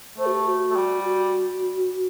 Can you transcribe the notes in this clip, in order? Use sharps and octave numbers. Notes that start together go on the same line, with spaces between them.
A3 C5
F#4
G4
F#4
A3
G3
F#4